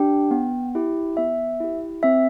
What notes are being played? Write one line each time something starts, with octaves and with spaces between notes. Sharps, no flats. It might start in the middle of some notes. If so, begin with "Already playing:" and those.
Already playing: D4 G4 G5
B3
E4 G4
B3 E5
E4 G4
C4 E5